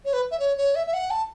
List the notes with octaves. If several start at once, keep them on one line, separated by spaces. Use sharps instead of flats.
C#5
B4
E5
C#5
C#5
E5
E5
F#5
A5